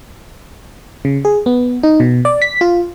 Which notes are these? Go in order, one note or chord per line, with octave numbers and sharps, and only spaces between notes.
C#3
G#4
B3
D#4
B2
D5
B6
F4